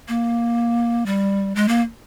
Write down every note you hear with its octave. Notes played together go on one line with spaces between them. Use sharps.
A#3
G3
G#3
A#3